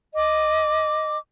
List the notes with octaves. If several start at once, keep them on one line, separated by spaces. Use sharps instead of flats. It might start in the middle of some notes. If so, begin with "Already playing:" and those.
D#5 D6